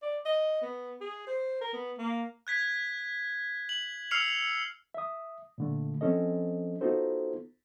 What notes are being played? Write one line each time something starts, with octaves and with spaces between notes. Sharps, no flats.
D5
D#5
B3
G#4
C5
A#4
B3
A#3
F#6 G#6 B6
F#7
E6 F6 C7 C#7 F7
E5 D#6
A#2 D3 A3
F3 C4 C#4 A4 D#5
B3 D#4 F4 F#4 A4 C5